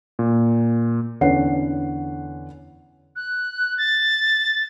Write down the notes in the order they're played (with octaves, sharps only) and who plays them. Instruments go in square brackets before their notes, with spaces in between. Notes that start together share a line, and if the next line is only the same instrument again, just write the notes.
[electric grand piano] A#2
[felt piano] E2 D3 C#4 B4 F#5 C7
[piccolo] F#6
A6